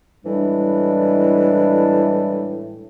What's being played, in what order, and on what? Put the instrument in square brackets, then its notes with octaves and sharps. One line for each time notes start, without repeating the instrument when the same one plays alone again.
[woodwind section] A2 E3 G3 G#3 D4